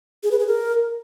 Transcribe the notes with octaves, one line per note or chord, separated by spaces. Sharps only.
G#4
B4
G#4
A#4